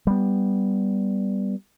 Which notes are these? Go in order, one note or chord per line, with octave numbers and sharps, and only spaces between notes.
G3 B3